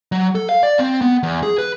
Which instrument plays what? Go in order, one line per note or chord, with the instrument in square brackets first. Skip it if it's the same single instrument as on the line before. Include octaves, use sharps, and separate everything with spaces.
[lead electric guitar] F#3
A4
F5
D5
C4
B3
E2
G#4
B4